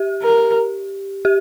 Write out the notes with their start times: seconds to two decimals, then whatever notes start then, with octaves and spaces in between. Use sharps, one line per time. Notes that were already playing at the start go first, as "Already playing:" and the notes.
Already playing: G4
0.22 A#4
1.25 G4